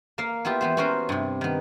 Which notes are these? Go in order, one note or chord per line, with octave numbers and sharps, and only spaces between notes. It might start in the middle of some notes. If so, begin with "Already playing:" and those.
A#3 F5
B3 E4 F4 G4
E3 B3 C5
B3 C#4 F#4 A#4 C5
G2 C3
D#3 B3